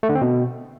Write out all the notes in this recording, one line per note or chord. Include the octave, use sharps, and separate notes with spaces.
A3
D3
C4
B2